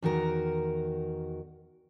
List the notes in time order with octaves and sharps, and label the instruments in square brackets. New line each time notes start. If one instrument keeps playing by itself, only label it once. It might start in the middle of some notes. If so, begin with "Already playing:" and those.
[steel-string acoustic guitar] E2 D#3 F#4 A#4